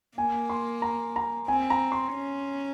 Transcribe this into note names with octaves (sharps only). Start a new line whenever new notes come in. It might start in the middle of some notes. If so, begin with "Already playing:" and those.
A#3 G#5
C6
A#5
A#5
C4 G#5
A#5
C6
C#4